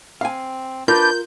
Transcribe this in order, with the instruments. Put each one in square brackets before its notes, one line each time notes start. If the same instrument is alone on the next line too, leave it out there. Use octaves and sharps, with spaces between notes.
[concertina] C4 [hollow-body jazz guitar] F5 G#5
[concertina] D4 B4 D5 [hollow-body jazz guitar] F4 A#4 [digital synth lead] G6